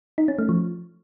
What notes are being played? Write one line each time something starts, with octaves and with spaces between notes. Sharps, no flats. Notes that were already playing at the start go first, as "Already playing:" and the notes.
D#4
C#4
A3
F3